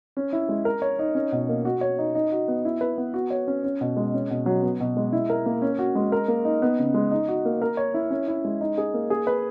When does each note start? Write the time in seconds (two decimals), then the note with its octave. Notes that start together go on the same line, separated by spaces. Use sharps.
0.17 C#4
0.33 E4
0.49 G#3
0.65 A#4
0.82 C#5
0.99 D#4
1.15 C#4
1.32 B2
1.49 A#3
1.65 F#4
1.81 C#5
1.99 D#4
2.15 D#4
2.32 F#4
2.48 B3
2.65 E4
2.81 B4
2.98 B3
3.14 F#4
3.30 C#5
3.47 C#4
3.64 C#4
3.81 B2
3.97 G#3
4.14 C#4
4.30 B2
4.46 F#3
4.63 B3
4.80 B2
4.97 G#3
5.13 E4
5.30 A#4
5.46 A#3
5.62 C#4
5.79 F#4
5.95 G#3
6.12 A#4
6.28 A#3
6.45 D#4
6.62 B3
6.79 C#3
6.94 G#3
7.11 D#4
7.28 F#4
7.45 A#3
7.62 A#4
7.77 C#5
7.94 E4
8.10 C#4
8.28 E4
8.45 G#3
8.61 D#4
8.78 G#4
8.94 A#3
9.10 G#4
9.27 B4